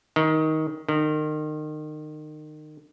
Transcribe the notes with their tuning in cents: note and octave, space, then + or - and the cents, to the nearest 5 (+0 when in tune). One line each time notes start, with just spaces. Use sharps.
D#3 +15
D#3 -30